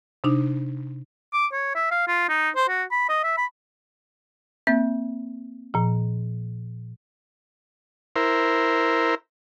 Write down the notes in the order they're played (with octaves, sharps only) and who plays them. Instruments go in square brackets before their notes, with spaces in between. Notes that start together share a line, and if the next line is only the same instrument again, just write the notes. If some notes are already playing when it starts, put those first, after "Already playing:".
[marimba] C3 D4 D#4
[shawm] D6
C#5
E5
F5
F4
D#4
C5
F#4
B5
D#5
E5
B5
[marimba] A#3 C4 E5 G6
A#2 F3
[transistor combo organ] E4 A#4 C5